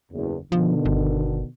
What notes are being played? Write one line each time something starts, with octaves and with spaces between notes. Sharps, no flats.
F#1 E2
B2 D3 D#3 F3
G1